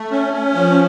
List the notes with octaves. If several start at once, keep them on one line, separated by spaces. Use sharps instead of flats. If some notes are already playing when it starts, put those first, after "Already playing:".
Already playing: A3
C#4
C#4
F3